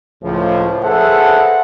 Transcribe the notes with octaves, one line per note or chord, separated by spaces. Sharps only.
C#2 A2 F3
G#4 A4 B4 C5 E5 F#5